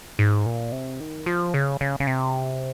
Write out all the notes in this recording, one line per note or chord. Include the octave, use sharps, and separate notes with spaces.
G#2
A#2
C3
D#3
F3
C#3
C#3
C#3
C3